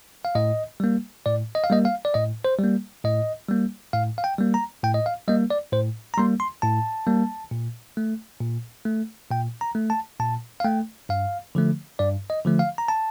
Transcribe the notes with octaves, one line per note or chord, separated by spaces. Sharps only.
F5
A2 D#5
G3 A#3
A2 D5
D#5
F5
G3 A#3 D#5
F5
D5
A2 D#5
C5
G3 A#3
A2 D#5
G3 A#3
A2 F5
F5
G5
G3 A#3
A#5
A2 G5
D#5
F5
G3 A#3 D#5
D5
A2 C5
A#5
G3 A#3 C6
C6
A2 A5
G3 A#3
A#2
A3
A#2
A3
A#2 G5
A#5
A3
A5
A#2 A5
F5
A3 G5
G2 F5
D3 F3 A3
G2 D5
D#5
D3 F3 A3
F5
A#5
A5